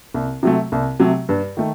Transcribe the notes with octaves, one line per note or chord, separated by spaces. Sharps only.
C2
C3 F#3 A3
C2
C3 F#3 A3
G2
D#3 A3